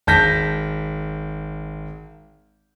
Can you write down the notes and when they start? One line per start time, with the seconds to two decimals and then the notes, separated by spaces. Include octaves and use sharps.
0.07 G#1 A5 G6 A#6 B6